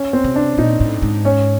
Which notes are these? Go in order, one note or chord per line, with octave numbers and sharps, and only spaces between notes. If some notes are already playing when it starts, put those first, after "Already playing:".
Already playing: C#4
C4
C3
D4
A#2 D#4
A2
G#2
C#4